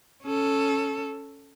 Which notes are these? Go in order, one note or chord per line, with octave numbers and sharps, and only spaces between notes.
C#4 A4